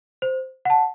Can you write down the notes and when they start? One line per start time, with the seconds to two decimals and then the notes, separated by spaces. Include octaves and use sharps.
0.22 C5
0.65 F#5 A5